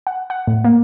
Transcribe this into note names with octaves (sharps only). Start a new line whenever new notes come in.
F#5
F#5
A2
A#3